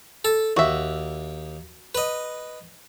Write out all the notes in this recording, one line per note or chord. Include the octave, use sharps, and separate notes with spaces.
A4
D#2 F#4 E5
B4 D#5